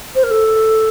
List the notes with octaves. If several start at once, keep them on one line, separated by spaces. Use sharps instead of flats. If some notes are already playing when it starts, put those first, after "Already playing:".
C5
A#4
A4